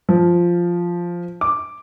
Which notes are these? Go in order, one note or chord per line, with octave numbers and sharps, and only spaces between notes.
F3
D6